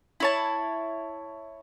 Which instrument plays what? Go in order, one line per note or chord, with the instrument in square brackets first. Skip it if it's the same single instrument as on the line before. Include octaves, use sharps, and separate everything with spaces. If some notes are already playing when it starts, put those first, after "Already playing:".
[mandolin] E4 C#5 A5